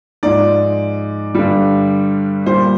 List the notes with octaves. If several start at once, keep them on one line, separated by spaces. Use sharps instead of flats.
G#2 F3 G#3 D5
G2 D3 G3
A#2 G3 C5